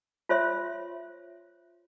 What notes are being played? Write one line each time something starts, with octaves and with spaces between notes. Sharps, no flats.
F4 C5 C#5 E5 C6